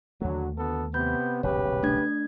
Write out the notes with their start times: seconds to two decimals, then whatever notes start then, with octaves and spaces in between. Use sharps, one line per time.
0.22 D#2 D3 F#3 A3
0.57 D2 B3 A4
0.94 C3 B3 B5 G6
1.43 D#1 B1 E2 C#3 G4 B4 C#5
1.83 A3 D4 G#6